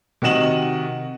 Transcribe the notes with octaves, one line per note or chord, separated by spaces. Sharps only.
C3 D#3 F#4 D#5 E7 F#7